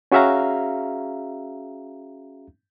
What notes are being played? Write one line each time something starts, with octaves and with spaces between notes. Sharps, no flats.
C#4 F#4 G#4 E5 F5 A#5